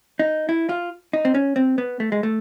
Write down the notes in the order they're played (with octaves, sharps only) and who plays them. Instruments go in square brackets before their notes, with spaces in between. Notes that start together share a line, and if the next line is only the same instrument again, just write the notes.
[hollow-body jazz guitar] D#4
E4
F4
D#4
C4
C#4
C4
B3
A3
G#3
A3